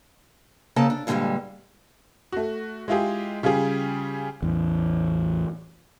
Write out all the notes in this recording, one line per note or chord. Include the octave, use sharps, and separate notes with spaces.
C#3 A#3 A4 G#5 A5
D4
G2 A#2 D3 F3 G3 G#3
A3 F#4
G#3 E4 F4 G4 G#4
C#3 G3 F4 G4 G#4
A1 E2